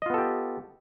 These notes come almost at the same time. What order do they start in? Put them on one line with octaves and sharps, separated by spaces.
D#5 F4 B3 A4 G4